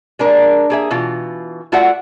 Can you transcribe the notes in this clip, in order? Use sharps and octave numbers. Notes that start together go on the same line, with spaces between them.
G#3 D4 A#4
A#3 G#4 E5
B2 E3 F4
A3 F4 F#4 D5 E5 F#5